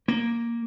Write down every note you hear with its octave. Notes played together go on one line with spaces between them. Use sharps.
A#3